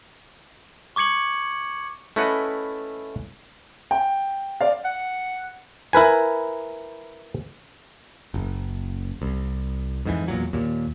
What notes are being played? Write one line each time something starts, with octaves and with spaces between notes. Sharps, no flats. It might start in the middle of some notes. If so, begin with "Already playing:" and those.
C#6 D6 G#6 C#7 F#7
A3 C#4 E4 B4 D#5 F#5
G5
D5 F5
F#5
E4 A#4 B4 G#5
F#1
C2
F2 G#2 E3
E2 A#2 F#3
D#2 A#2